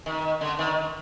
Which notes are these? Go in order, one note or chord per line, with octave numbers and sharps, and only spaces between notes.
D#3
D3
D#3